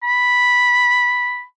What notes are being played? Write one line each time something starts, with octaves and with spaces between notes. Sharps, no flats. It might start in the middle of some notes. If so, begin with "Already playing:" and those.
B5